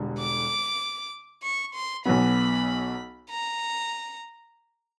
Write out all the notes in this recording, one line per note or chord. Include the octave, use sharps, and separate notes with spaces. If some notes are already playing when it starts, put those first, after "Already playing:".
Already playing: E1 D3 G3
D6
C#6
C6
B1 B2 F#3 B3 B5
A#5